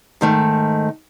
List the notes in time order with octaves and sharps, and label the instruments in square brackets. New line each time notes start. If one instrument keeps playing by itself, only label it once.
[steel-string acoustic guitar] G#2 D#3 A3